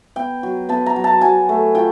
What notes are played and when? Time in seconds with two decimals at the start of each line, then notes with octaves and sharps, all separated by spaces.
0.16 B3 G5
0.43 F#3
0.69 B3 A5
0.86 A#5
0.96 F#3
1.04 A5
1.21 F#3 G#5
1.49 A3
1.75 F4 G5